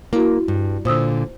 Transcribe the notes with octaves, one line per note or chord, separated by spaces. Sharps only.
A#3 E4 F#4
G2
A#2 D3 C5 D#6 E6